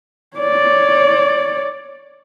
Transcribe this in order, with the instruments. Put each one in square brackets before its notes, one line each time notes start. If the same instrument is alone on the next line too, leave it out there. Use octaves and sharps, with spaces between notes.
[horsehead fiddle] C#5 D5